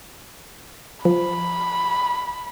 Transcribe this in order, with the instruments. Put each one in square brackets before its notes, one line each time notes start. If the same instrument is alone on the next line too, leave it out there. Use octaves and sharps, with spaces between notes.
[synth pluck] F3 [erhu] B5